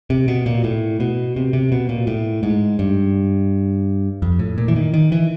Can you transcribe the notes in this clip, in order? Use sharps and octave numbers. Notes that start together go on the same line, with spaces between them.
C3
B2
A#2
A2
B2
C3
C3
B2
A#2
A2
G#2
G2
F2
A2
A#2
E3
D#3
D#3
E3